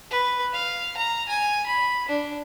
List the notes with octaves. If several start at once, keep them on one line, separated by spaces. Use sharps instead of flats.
B4
F5
A#5
G#5
B5
D4